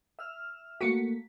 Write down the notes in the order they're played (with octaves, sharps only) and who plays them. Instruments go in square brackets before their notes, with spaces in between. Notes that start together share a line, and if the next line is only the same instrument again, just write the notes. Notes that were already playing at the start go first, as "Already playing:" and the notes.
[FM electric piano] E5 E6 F6
[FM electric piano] A3 A#3 B6 [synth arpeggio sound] F#4 C#7